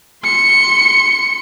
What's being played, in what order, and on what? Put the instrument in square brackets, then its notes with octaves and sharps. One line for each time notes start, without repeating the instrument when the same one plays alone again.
[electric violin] C6 C#7